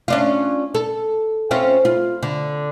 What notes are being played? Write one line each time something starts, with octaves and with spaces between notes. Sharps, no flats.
C#4 D4 F4
A4
C4 C#4 F4
F4
D3